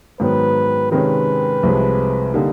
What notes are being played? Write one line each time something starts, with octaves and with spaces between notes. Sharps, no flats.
G#2 D#3 F#3 B3 B4
C3 D#3 G#3 C#4 B4
C2 C3 F3 G#3
D3 G3 A#3 D#4